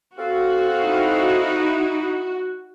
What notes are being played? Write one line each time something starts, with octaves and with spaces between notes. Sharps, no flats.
C4 F#4 A4 F5
D#4 E4